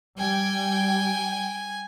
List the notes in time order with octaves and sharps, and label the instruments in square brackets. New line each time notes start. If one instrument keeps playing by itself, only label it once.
[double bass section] G3 [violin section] G5 [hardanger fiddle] G#5